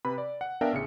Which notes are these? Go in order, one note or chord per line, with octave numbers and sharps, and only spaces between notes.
C3 B4 B5
D5
F#5
B3 D4 A#4 E5 F5 G5
A1 C#3 C#7